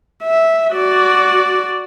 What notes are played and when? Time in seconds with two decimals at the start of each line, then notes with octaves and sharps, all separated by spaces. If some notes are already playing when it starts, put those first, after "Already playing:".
0.23 E5
0.74 F#4 D5